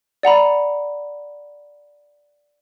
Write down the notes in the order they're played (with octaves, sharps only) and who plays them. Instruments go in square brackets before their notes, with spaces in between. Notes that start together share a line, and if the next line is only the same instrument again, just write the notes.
[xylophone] D5 F#5 A#5 B5